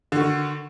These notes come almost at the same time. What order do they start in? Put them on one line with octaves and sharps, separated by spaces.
D3 F#4 D#3